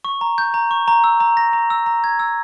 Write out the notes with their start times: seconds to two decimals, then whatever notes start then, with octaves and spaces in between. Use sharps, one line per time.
0.05 C#6
0.21 A#5
0.38 G6
0.54 A#5
0.71 C#6
0.88 A#5
1.04 E6
1.20 A#5
1.37 A#6
1.53 A#5
1.70 E6
1.86 A#5
2.04 G#6
2.20 E6